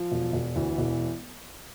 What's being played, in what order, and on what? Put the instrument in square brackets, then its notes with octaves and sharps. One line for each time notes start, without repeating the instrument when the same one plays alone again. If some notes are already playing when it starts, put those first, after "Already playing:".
Already playing: [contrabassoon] F3
[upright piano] E1
E1
[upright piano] D2 [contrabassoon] E3
[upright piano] E1